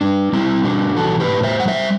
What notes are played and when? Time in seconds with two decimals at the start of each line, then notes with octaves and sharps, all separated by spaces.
0.01 G3 D4
0.33 G3 C4 E4
0.64 B2 D4 F#4
0.96 E3 F#4 A4
1.20 G4 B4
1.28 A2
1.43 C5 E5
1.59 G3 F#5
1.68 C5 E5